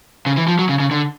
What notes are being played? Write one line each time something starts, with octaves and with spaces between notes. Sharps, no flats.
C#3
E3
F3
F#3
C#3
C#3
D3